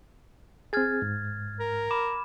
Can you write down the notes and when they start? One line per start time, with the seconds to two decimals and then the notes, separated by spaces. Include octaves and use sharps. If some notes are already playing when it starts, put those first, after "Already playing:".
0.73 C4 G#4 F6 G#6 A6
1.02 G#2
1.60 A#4
1.91 B5 D6 E7